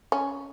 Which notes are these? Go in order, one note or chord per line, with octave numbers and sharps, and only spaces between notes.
C#4